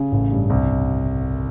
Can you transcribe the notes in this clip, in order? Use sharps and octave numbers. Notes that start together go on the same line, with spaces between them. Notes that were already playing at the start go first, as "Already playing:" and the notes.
Already playing: C#3
A1
G2
C2